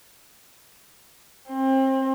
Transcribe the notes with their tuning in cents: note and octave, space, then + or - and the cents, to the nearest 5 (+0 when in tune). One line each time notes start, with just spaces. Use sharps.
C4 +30